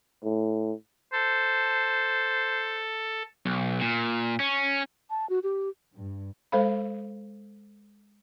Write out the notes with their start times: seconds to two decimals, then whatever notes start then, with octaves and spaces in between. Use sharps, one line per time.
0.24 A2
1.13 A4 C5
3.46 B1
3.81 A#2
4.40 C#4
5.10 A5
5.29 F#4
5.43 G4
5.94 G2
6.52 G#3 A4 C5 F5 B5